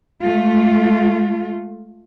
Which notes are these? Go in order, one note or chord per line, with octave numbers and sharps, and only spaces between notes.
G#3 A3 F4